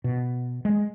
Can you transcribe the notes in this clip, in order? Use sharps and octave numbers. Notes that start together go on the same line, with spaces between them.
B2
G#3